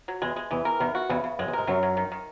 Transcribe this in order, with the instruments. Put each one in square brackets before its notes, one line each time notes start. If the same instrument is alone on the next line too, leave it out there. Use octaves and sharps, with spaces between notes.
[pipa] F#3
[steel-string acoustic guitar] E2 [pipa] G#3
[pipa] G#3
[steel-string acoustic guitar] E2 [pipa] E3
[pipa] A#4
[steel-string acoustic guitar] E2 [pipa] D#3
[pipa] F#4
[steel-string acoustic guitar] E2 [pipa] C#3
[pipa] C#3
[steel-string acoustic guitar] F#2 [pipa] G#3
[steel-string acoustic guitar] E2
[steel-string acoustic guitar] G#2 [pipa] A#4
[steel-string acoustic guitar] F#2 [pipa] F#3
[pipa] F#3
D#3
D#3